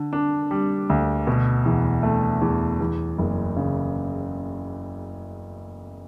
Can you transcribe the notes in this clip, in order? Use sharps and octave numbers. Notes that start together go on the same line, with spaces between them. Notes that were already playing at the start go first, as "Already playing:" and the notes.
Already playing: D3
D4
G3
D2
B2
E2
A3
E2
E2
F#1
C#3